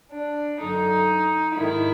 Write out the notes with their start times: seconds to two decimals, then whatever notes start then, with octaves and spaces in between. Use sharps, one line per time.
0.13 D4
0.61 F#2 D3 D#4
1.56 G#2 D#3 E4